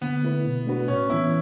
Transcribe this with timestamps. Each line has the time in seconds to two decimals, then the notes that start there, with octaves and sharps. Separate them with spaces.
0.01 D3 B3
0.23 A3 E4 B4
0.45 B2
0.66 A3 D4 F#4 B4
0.88 A2 C#4
1.09 E3 B3 E4